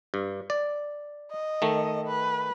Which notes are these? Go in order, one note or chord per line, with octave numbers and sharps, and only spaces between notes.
G2
D5
D#5
D#3 A3
B4